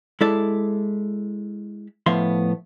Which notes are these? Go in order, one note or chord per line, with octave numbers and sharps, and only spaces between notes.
G#3 E4 A4 D5
A2 F3 B3 E5 F5 C6